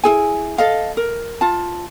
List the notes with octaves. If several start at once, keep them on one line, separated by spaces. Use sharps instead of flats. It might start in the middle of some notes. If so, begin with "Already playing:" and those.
E4 G#4 G#5
A4 D#5 F5
A#4
F4 A5